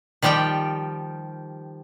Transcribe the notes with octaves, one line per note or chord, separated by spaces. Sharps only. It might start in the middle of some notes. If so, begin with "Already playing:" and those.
D#3 F3 G3 G4 G5